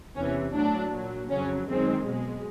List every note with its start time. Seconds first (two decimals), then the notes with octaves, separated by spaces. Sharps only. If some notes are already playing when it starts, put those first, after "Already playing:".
0.16 E2 C3 E3 C#4
0.54 A2 F#3 D4
0.92 A#2 F#3
1.30 F2 C#3 F#3 C#4
1.67 F#2 D#3 G#3 C4
2.06 B2 G#3